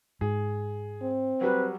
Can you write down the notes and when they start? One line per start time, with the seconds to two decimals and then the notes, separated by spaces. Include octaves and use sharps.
0.21 G#2 G#4
1.02 C4
1.41 F#3 G3 B4